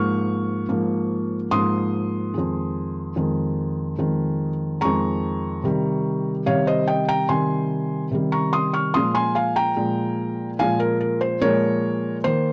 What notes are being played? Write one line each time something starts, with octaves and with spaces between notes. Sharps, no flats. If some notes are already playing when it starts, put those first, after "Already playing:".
Already playing: G#2 F3 A#3 C#6 F6
G#2 F3 A#3
G#2 F3 A#3 C6 D#6
F2 D#3 G#3
F2 D#3 G#3
F2 D#3 G#3
F2 D#3 G#3 A#5 C#6
C3 D#3 G3
C3 D#3 G3 C#5 F5
C5 D#5
D#5 G5
G5 A#5
C3 D#3 G3 G#5 C6
C3 D#3 G3
A#5 C#6
C6 D#6
C#6 F6
A#2 F3 G#3 C6 D#6
G#5 C6
F5 G#5
G5 A#5
A#2 F3 G#3
A#2 F3 G#3 F5 G#5
A#4
A#4
C5
A#2 F3 G#3 A#4 C#5
D#3 A#3 C5